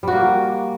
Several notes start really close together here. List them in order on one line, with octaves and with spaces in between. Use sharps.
G3 F#4 A#3